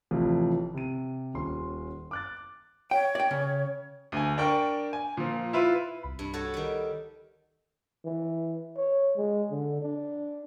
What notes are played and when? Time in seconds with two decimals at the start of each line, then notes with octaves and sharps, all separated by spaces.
0.11 A1 C3 E3 F3
0.74 C3 D#7
1.34 D#1 C#4 C6
2.11 D6 F#6 A6
2.91 C#5 G5
3.15 D5 G5
3.31 C#3
4.12 D2 G#5
4.38 D4 A#4 G5 C#6
4.93 G#5
5.17 A#2 F3
5.53 E4 F4 B4
6.03 C2 B5
6.19 G2
6.33 F#4 A4 C#5
6.54 D#3 G3
8.05 E3
8.76 C#5
9.17 G#3
9.50 D3
9.82 D4